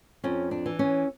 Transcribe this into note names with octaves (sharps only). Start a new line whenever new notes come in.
F2 C#4
D4
E3
C#4